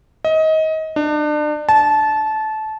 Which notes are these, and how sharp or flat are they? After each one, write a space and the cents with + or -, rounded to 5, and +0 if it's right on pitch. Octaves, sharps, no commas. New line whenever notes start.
D#5 +25
D4 +35
A5 -20